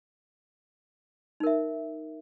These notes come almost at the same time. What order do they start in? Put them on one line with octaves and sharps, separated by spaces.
D#4 A#4 E5